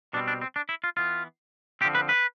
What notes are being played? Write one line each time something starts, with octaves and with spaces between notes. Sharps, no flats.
B2 G3 C4 D4
D4
C4
D4
E4
F4
E3 B3 F4
D3 F3 C4 G4
B4
B4